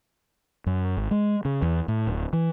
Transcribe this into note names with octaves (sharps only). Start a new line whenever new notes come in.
F#2
G#1
G#3
C#3
E2
A2
D1
E3